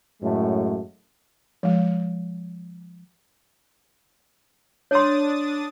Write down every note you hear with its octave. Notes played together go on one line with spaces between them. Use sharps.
F#2 A2 G#3 A3
F3 G#3
D4 C#5 C6 D#6 A6